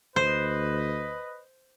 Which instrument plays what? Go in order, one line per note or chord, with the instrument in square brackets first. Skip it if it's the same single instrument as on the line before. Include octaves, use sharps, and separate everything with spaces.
[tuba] D2 [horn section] B4 D#5 [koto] C5